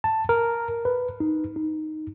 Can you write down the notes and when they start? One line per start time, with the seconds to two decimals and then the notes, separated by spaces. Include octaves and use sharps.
0.04 A5
0.29 A#4
0.85 B4
1.20 D#4
1.56 D#4